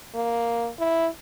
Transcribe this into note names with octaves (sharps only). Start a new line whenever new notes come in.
A#3
E4